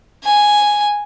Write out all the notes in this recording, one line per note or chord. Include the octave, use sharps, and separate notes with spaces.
G#5